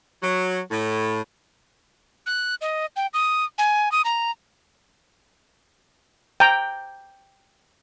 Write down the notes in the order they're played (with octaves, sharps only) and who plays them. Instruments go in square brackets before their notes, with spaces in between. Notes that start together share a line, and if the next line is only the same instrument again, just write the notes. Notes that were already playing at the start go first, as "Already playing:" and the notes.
[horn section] F#3
A2
[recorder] F#6
D#5
G5
D#6
G#5
D#6
A#5
[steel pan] G5 A#5